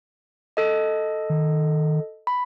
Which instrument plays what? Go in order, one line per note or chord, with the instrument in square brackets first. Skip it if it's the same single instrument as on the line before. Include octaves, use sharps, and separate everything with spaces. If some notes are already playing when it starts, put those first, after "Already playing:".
[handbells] A4 D#5
[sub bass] D#3
[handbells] B5